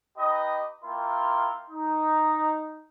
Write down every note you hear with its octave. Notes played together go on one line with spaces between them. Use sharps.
D#4 G4 B4 D#5
A#3 E4 F4 A#4 G5 C6
D#4